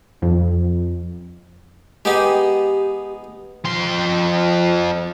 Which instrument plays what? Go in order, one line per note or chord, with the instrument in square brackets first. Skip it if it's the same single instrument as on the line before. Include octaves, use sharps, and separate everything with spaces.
[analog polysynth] F2
[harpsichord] G#3 B3 D#4 [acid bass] G4
[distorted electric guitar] F2 C6